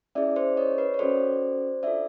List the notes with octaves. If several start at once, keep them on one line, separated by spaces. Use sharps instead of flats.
C#4 E4 G#4 D5 E5
C5 D5
C#5 D#5
B4 C#5
C#5
C#4 F#4 A4 C5 D5
D4 F4 A4 D5 E5